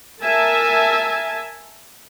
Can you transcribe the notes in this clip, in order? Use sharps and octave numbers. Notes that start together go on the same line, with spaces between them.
A#4 E5 G#5 A5